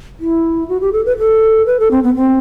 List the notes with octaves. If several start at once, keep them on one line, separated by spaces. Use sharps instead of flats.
E4
F#4
G4
A4
B4
A4
B4
A4
C4
B3
C4